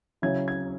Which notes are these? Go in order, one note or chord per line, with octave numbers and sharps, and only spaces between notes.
C#3 F#3 C#4 E4 G#6
G#6